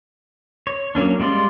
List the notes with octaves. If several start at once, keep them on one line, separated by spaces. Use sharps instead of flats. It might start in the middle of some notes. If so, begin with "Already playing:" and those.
C#5
F#3 A#3 C#4 D4
G3 G#3 F4 D5 C6